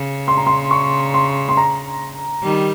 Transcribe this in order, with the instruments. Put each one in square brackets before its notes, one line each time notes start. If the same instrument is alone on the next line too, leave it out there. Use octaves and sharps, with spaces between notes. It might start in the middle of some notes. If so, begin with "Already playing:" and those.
Already playing: [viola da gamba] C#3
[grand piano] C6
A#5
C6
C#6
C6
C6
A#5
[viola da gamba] D#3 G3